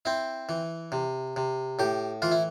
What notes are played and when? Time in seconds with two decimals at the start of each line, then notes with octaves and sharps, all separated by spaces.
0.05 C4 E4
0.49 E3
0.92 C3
1.36 C3
1.79 A2 G4
2.22 E3 F4
2.31 E4